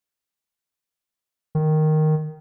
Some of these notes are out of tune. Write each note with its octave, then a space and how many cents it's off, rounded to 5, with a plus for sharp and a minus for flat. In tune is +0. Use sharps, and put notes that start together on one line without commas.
D#3 -5